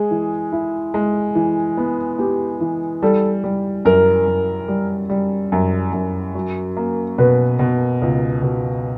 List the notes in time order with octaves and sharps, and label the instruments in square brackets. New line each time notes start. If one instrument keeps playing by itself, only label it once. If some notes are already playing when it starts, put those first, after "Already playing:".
Already playing: [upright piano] G#3 [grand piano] G#4
[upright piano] E3
E4
G#3
E3
B3
[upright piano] B3 [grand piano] G4
[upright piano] E3
[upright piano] G3 [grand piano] A4
[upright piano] G3
[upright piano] F#2 [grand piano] A#4
[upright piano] F#2
G3
G3
F#2
F#2
F#3
A#3
[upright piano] B2 [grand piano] B4
[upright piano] B2
C#2
B2